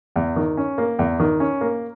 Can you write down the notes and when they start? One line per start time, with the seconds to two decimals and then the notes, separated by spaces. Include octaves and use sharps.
0.16 E2
0.36 D#3
0.57 C#4
0.78 A#3
0.99 E2
1.20 D#3
1.40 C#4
1.61 A#3